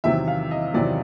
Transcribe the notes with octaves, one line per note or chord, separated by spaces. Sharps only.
E2 C3 D#3 F#3 E5
F5
D#5
E2 C3 D#3 F#3 D5